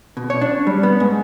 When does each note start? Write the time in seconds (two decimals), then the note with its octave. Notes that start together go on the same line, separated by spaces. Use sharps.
0.17 B2
0.30 C#5
0.41 D4
0.67 G3
0.83 B3
1.00 G#2